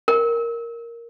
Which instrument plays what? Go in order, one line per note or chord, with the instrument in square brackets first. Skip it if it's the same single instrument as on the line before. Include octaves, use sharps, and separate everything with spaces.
[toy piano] A#4